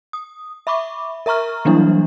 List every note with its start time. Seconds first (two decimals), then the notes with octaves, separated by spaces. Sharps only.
0.13 D#6
0.67 E5 B5 C#6 D6
1.26 A#4 E5 A#5 C#6 F6
1.65 E3 F#3 G3 A#3 D4 E4